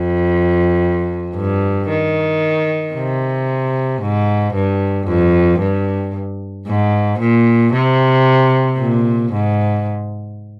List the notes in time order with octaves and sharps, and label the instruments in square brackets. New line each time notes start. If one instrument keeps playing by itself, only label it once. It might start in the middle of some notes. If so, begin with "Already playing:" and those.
Already playing: [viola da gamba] F2
G2
D#3
C3
G#2
G2
F2
G2
G#2
A#2
C3
A#2
G#2